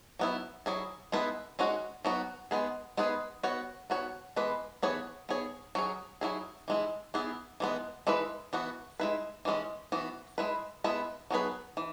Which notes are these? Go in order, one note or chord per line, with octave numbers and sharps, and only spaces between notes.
F#3 B3 E4
F#3 E4 G#4
G#3 B3 E4 B4
G#3 C#4 F#4
F#3 B3 F#4
G#3 B3 G#4
G#3 B3 G#4 B4
B3 F#4 C#5
B3 F#4 C#5
E3 G#3 B3 B4
E3 B3 G#4 C#5
B3 G#4 C#5
F#3 C#4 G#4
F#3 E4 G#4
E3 G#3 E4
E3 B3 E4 G#4
E3 G#3 B3
E3 G#3 E4 B4
E3 B3 F#4
G#3 E4 B4
E3 G#3 C#4
E3 B3 F#4
G#3 E4 B4
G#3 B3 E4 B4
F#3 B3 G#4 B4
E3